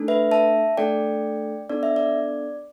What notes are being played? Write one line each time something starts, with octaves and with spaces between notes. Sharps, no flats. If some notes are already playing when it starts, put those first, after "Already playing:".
Already playing: A3 D4 A4
B4 E5
E5 A5
A3 D4 A4 D5 G5
B3 D4 A4 D5
E5
D5